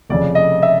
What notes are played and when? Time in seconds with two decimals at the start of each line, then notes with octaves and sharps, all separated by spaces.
0.09 F1 F2 C#3 D5
0.35 D#5
0.63 E5